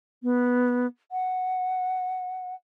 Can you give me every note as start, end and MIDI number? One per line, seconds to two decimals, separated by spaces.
0.23 0.86 59
1.12 2.55 78